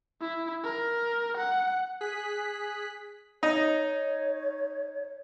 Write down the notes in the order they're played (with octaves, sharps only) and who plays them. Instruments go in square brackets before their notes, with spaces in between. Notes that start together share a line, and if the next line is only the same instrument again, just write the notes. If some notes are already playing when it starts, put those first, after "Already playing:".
[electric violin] E4
A#4
F#5
[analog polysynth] G#4 F#6 B6
[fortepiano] D#4 [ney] C#5